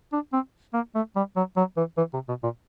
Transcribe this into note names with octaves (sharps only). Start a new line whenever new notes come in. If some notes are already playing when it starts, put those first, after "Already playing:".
D4
C4
A#3
A3
G3
F#3
F#3
E3
E3
C3
B2
A#2